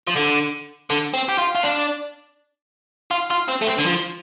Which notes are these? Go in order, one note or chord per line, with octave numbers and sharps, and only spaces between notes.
F3
D3
D3
C4
G4
F4
F4
D4
F4
F4
C4
A3
C4
D3
F3